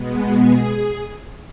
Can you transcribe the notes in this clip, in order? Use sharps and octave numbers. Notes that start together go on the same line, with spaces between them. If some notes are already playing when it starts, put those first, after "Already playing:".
Already playing: B2 G#3 B3
G#4